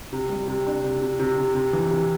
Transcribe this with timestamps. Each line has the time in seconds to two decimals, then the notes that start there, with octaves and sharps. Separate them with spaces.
0.13 C3
0.30 G3
0.48 C3
0.67 D4
0.84 C3
1.02 C3
1.20 C3
1.37 C3
1.55 C3
1.73 E3
1.91 C3